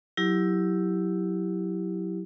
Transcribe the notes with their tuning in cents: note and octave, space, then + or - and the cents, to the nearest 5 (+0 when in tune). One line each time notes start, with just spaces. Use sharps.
F#3 +0 E4 +0 G4 +0